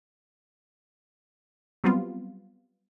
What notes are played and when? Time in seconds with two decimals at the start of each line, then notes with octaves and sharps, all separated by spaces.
1.84 F#3 G3 B3 C4 F4